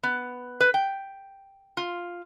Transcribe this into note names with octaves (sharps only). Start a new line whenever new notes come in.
B3
B4
G5
F4